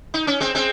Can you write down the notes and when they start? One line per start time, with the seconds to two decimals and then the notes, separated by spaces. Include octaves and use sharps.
0.14 D#4
0.27 C#4
0.40 G#3 C4
0.55 G#3 C4